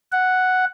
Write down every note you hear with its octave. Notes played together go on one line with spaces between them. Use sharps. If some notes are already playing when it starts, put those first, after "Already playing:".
F#5